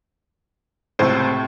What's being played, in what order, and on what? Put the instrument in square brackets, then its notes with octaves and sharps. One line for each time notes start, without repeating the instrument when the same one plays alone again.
[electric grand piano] C#2 C5 [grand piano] A2 C3